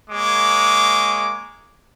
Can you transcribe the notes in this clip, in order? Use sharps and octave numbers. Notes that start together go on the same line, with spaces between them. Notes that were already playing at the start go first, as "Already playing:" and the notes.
G#3 A#3 G#4 C#5 D6